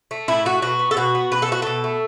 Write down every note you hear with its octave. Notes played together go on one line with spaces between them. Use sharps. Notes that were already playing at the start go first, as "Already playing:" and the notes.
A3
A2 E4
A3 F#4
B2 F#4
B3
A4
B2 F#4
B3
B2 B4
A4
A3 F#4
B2 A4
A3